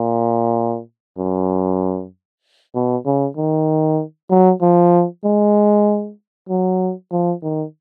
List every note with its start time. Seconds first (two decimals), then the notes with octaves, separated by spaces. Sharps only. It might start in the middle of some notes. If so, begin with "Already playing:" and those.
Already playing: A#2
1.18 F#2
2.75 B2
3.06 C#3
3.37 D#3
4.30 F#3
4.62 F3
5.25 G#3
6.49 F#3
7.12 F3
7.43 D#3